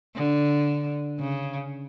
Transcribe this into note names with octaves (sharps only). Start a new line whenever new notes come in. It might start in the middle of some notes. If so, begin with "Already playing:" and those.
D3
C#3